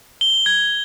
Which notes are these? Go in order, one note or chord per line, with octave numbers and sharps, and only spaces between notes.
G7
G#6